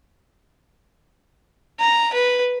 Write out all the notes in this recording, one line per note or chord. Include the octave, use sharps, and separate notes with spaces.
A#5
B4